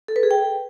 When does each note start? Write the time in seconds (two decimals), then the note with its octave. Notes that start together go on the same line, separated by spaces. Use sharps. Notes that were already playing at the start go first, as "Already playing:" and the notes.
0.08 A4
0.16 B4
0.23 G#4
0.31 G5